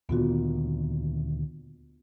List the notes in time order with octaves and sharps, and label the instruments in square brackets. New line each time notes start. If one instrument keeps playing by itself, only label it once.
[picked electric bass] D2 A#2 D#3 [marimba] B3 F4 F#4